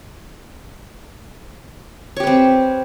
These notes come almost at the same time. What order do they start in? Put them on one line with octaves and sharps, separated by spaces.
C#5 G4 B4 C4